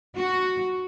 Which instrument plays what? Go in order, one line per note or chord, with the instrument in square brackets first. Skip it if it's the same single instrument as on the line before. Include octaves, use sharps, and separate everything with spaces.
[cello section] F#4